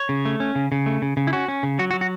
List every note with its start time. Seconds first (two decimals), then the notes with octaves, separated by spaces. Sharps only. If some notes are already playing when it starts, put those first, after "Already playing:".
Already playing: C#5
0.09 C#3
0.25 A3
0.40 C#4
0.55 C#3
0.72 C#3
0.86 A3
1.02 C#3
1.17 C#3
1.27 E4
1.33 C#4 F#4
1.48 C#4
1.63 C#3
1.79 F#3 F#4
1.91 F#4
1.94 F#3
2.01 F#4